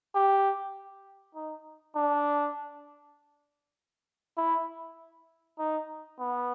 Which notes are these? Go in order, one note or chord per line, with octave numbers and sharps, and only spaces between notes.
G4
D#4
D4
E4
D#4
B3